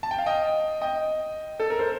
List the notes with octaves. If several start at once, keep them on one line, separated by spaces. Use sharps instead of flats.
A5
G5
F5
D#5 G5
D#5 G5
A4
A#4
A4 C5